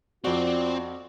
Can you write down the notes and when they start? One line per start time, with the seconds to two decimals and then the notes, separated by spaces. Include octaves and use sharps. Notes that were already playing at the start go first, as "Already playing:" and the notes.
0.24 F2 C4 F4 F#4 D5